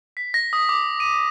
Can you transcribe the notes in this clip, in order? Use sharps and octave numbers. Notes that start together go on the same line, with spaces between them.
B6
A#6
D#6
D6
D#7